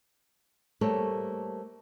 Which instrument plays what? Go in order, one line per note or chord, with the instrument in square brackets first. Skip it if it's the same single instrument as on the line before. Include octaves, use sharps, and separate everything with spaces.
[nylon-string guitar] G3 A3 A#3 A4 C5 C#5